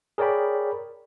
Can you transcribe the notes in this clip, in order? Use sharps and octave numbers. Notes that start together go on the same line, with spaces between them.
G#4 A#4 C#5 D5 G5 B5